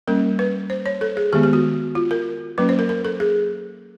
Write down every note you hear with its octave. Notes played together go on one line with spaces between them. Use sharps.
G3 A#3 C#4 A#4
B4
C5
C#5
A4
G#4
D#3 G#3 B3 G4
G4
F#4
F4
A#4
F#3 A#3 C#4 B4
C5
A#4
A#4
A4
G#4